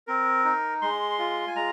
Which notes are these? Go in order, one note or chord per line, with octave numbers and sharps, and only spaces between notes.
C4 A#4
D#4
G#3 C6
F4
G#5
G#3 A#5